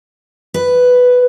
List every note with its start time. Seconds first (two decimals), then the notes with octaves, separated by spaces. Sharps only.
0.54 B4